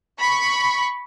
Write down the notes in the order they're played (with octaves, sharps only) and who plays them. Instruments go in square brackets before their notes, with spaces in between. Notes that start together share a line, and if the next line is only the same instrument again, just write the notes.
[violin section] B5 C#6